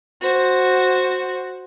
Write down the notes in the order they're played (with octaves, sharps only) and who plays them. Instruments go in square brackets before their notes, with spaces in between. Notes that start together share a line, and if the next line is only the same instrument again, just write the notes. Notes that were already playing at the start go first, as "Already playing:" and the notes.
[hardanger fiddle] F#4 C5